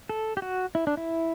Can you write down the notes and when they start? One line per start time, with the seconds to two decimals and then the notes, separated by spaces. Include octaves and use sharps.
0.09 A4
0.37 G4
0.42 F#4
0.75 E4
0.87 D4
0.97 E4